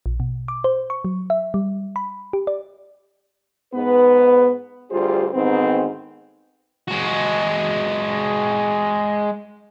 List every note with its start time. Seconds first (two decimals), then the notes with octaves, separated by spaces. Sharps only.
0.06 A#1
0.20 B2
0.48 D6
0.64 C5
0.90 C#6
1.05 F#3
1.30 E5
1.54 G3
1.96 B5
2.33 G4
2.47 D5
3.74 G#2 B3 B4
4.91 D2 G3 F4 G4 G#4 C5
5.34 D2 G#2 D#3 B3 C4
6.88 G#3 F#4